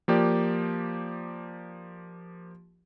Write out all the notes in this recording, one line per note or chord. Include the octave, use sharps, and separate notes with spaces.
F3 A#3 G4 D5